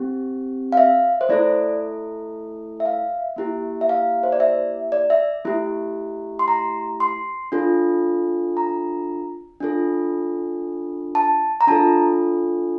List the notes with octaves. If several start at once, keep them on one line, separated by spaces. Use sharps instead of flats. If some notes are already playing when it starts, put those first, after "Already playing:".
Already playing: C4 G4
F5
E5
C5
A3 E4 A4 D5
E5
F5
A#3 E4 G4
E5
F5
C5
D5
E5
D5
E5
A3 E4 G4
C6
A#5
C6
D4 F4 A4
A#5
D4 F4 A4
A5
A#5
D4 F4 A4 A5